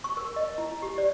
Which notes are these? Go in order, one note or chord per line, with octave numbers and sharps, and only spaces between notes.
C#6
A#4
D#5
E4
G4
D5